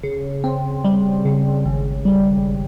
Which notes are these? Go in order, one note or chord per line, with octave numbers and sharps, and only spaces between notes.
C#3
C4
G3
C#3
G#1
G3